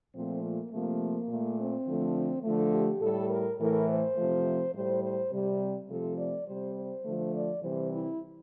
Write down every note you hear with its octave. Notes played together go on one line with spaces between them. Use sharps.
A#2 F3 A3 C4
A#3
C3 F3 A3 A#3
A#2 A3
C4
D3 F3 A3
D3 F3 A3
G4
A2 G3 A4
A#4
A2 E3 A3 A#4
C5
C3 F3 A3
A2 G3 C5
C5
C3 G3
C3 F3 A3 A4
D5
C3 G3 C5
C5
D3 F3 A3
D5
C3 E3 G3 C5
E4